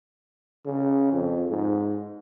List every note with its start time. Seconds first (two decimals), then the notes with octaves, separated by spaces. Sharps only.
0.66 C#3
1.13 F2
1.50 G#2